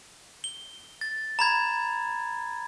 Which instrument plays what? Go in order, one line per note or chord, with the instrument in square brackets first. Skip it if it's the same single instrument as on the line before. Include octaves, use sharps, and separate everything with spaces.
[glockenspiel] G7
A6
A#5 B5 G#6